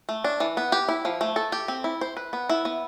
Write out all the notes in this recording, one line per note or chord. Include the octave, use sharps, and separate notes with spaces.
A3
D4
E3
B3
G4
E4
F3
A3
A4
G4
C4
E4
C5
B4
B3
E4
B3